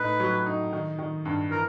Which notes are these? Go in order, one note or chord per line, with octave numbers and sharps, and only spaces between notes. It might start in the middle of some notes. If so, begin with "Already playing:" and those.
Already playing: A2 D#4 B4
F#3
D#4
D#3
D#3
G2
E3 A#4